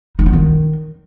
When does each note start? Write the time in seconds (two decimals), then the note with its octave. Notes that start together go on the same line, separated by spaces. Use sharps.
0.19 D#4
0.26 B3
0.33 D#3